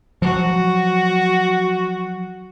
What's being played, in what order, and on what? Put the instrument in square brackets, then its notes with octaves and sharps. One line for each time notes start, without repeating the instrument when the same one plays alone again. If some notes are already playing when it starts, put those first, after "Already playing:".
[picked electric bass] F3 F#3 [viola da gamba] F#4